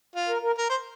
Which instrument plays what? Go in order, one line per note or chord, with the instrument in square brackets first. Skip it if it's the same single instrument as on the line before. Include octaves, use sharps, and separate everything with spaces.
[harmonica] F4
[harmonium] A#4
A#4
[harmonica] A#4
C5